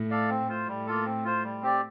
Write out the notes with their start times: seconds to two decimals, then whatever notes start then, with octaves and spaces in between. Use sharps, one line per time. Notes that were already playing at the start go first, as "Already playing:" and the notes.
Already playing: A2
0.10 A4 D5 F5
0.29 C4
0.49 F4 C5
0.67 A2 G3
0.86 A#3 F4 A4
1.05 C4
1.24 F4 C5
1.43 G3
1.62 C4 G4 D5